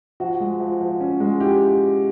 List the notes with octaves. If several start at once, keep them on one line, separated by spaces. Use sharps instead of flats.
F3 F#4
G#3
F3
F3
C#4
G#3
E4 G4